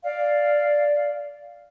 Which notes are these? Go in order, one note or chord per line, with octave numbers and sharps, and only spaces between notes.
D5 F5